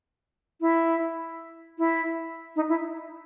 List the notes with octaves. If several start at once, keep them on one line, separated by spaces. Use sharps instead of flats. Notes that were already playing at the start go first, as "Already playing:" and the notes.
E4
E4
D#4
E4